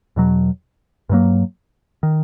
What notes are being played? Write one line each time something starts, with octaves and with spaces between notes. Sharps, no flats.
E2 B2 F#3
G2 D3 F#3 A#3
D#3